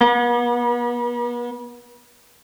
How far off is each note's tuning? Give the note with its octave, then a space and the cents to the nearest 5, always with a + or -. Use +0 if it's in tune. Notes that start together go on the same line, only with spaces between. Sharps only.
B3 -40